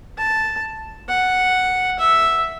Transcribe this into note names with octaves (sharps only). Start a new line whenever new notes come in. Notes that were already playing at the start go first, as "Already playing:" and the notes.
A5
F#5
E5